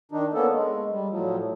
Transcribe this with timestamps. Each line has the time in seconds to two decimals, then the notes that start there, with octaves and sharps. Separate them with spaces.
0.12 D#3 D4 D#4
0.33 A#3 B3 C#4 A4
0.53 G#3
0.91 G3
1.09 A2 F3 F#3